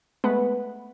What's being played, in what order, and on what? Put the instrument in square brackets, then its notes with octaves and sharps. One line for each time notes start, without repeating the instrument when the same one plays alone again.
[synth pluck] G#3 A3 B3 B4 F#5